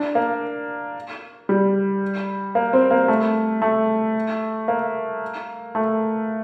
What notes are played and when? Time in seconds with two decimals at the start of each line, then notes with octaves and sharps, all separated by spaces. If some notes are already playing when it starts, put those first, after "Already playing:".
Already playing: D4
0.15 A#3
1.49 G3
2.55 A#3
2.73 C4
2.91 A#3
3.08 A3
3.62 A3
4.68 A#3
5.75 A3